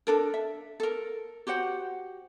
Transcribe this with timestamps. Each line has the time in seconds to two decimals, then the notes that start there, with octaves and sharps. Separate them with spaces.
0.07 D4 A4 A#4
0.34 E5
0.80 A4 A#4
1.47 F#4 G4 C5 F#5